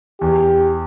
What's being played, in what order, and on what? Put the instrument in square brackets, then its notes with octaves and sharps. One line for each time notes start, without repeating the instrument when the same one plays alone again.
[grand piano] E2 [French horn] G4